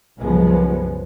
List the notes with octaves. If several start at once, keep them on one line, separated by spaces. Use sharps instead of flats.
C2 F#2 C#3 F3 G#3 B3